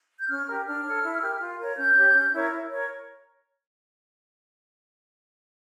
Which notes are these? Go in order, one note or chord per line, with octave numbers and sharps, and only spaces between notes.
G6
C#4 F6
G4 A#4
D4 F6
A4 C#5
E4
G4 A#4
F4
A#4 C#5
C#4 G6
G4 C#5
C#4
E4 A#4 C#5
E4
A#4 C#5